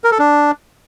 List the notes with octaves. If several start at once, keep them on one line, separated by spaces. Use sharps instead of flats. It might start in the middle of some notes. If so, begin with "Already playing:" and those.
A#4
A4
D4